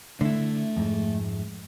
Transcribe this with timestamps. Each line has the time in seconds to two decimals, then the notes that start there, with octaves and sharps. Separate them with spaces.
0.21 D3 A3 E4
0.77 F2 G#2